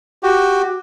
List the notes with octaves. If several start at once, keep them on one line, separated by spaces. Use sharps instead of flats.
F#4 G4